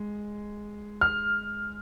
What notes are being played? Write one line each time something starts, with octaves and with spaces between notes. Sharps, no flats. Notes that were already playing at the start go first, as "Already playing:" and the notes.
Already playing: G#3
F6